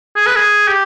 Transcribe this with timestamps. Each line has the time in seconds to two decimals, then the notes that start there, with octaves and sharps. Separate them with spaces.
0.16 G#4
0.26 B4
0.36 G#4
0.68 G4